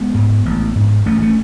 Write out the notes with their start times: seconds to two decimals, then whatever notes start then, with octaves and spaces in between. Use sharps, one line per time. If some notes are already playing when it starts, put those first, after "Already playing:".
Already playing: G#3 B3
0.14 G#2
0.46 A1
0.76 G#2
1.06 A1 A3 C#4
1.22 A3 C#4